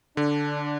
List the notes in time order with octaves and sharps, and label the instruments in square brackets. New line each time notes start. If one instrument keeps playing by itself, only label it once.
[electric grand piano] D3 [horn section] D4